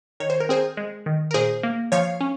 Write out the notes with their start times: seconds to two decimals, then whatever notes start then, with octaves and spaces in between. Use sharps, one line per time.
0.20 D#3 C#5
0.30 C5
0.40 A#4
0.49 C4 G#4 C5
0.77 G#3
1.06 D#3
1.31 A#4
1.34 A#2 G#4 C5
1.63 A#3
1.92 F3 C#5 F5
2.21 C#4